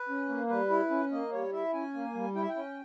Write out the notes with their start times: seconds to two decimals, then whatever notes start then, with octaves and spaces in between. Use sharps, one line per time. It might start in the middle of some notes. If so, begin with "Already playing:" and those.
Already playing: B4
0.09 C#4
0.29 A#3
0.49 G3 B4
0.70 E4
0.90 C#4
1.12 A#3 D#5
1.32 G3 C#5
1.52 E4 E5
1.73 C#4 G#5
1.94 A#3
2.14 G3
2.35 E4 G5
2.42 E5
2.49 G5
2.56 C#4